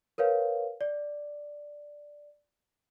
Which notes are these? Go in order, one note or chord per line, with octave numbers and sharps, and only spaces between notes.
A#4 B4 C#5 F5
D5